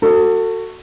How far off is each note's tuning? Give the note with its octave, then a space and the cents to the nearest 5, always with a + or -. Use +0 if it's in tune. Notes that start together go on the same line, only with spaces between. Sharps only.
F#4 +0 A4 +30